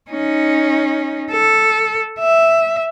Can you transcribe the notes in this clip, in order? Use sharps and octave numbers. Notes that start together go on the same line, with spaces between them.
C#4 D#4
A4
E5